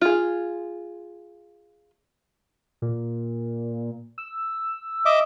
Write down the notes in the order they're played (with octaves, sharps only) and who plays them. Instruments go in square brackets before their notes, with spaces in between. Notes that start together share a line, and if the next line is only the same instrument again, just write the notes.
[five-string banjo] F4 G#4
[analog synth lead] A#2
E6
[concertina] D#5 E5 D6